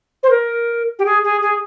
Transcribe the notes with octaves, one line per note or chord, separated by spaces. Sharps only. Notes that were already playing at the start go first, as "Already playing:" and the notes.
C5
A#4
G4
G#4
G#4
G#4